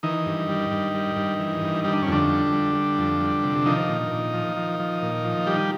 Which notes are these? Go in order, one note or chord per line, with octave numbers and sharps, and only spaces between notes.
D#3 E3 D#4
G2
G3
G2
G3
G2
E3
G2
G3 D#4
D4
C#4
F2 D3 D4
G3
G3
G3
F2
G3
C3
D#3 F3 D#4
A#2
A#2
F3
F3
F3
A#2
F3
G3 G4